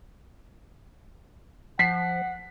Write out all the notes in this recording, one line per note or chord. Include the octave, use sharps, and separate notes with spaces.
F3 F#5 B6 C7